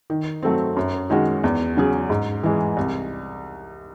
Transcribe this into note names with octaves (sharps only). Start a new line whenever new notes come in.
D#3
F#3 A3 C4
F#2
D#3 G#3 C#4 F#4
E2
C#3 F#3 C#4 G#4
G#2
E3 G#3
C2